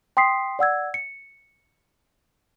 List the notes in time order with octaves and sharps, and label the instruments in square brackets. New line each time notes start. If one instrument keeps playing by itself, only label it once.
[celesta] G5 C6 D#6 B6 C7
D5 F#5 E6 G#6
C#7